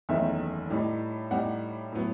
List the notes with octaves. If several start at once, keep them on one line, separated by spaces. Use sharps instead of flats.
F#1 E2 D#3 A3 D#4 E5
A2 G3 D#4
A2 G3 D#4 F#5
A2 F#3 B3